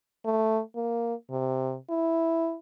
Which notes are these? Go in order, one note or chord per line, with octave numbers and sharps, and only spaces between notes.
A3
A#3
C3
E4